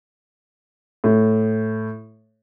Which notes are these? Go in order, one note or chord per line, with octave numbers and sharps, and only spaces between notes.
A2